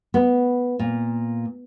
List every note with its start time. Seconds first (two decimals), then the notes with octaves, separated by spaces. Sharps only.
0.14 B3
0.79 A#2